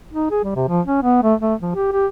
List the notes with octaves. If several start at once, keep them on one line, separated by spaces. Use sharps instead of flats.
D#4
G#4
G3
C3
F3
C#4
B3
A3
A3
F3
G4
G4